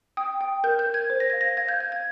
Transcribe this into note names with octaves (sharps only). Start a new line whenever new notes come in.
G5 D#6
G5
A#4 G6
G6
A#4
G#6
C5
A#6
F5 G#6
A#6
F5 G#6
G6
F5 G#6
G#6